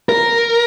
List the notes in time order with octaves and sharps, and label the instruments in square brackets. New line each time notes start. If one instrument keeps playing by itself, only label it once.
[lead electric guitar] A#4